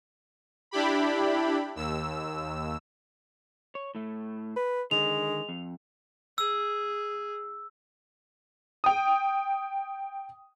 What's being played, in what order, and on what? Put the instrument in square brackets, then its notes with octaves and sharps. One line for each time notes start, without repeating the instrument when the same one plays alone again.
[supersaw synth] D4 E4 G4 B5
D#2 E6
[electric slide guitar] C#5
A2 A3
[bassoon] B4
[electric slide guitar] D3 D#3 [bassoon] G#3 [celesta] F7
[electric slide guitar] F2
[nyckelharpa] G#4 [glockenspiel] E6
[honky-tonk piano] G5 D#6